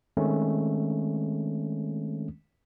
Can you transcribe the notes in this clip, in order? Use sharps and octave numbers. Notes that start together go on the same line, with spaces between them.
D#3 G#3 A3 C4 C#4